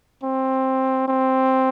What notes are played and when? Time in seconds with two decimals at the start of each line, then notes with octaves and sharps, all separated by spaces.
0.23 C4
1.08 C4